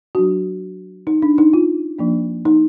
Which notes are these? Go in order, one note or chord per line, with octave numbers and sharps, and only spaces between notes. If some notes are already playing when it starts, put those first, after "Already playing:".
F#3 D4 F#4
D#4
D4
D#4
F4
F3 A#3 D4
D#4